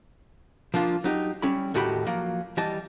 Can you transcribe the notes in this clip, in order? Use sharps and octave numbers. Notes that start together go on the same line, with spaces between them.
F3 A#3 D4 F4
F#3 D#4 G4
G3 C#4 E4 B5
D#2 A2 F#4 G4 G#5 B5
F3 F#3 A#3
E3 G3 D#5 A5